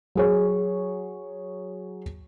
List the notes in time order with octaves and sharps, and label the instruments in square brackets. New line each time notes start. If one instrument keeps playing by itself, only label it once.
[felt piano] F#3 G#4 C#5